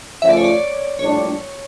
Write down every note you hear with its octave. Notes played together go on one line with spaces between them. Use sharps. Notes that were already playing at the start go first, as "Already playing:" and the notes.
C#3 F3 A3 C#4 F4 E5
D5
C#5
D5
A#1 A2 G3 D4 C#5